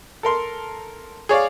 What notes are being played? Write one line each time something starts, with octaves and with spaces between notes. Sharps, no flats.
A4 A#4 C6
G#4 C#5 D5 F5